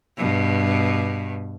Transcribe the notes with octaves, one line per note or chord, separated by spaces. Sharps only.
G2 B2